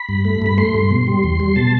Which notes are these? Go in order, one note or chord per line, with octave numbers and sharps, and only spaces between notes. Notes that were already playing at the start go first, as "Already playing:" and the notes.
Already playing: B5
G2
A3
G2 B5
A3 C6
G2
B2
G3
E2
G3
B2 A5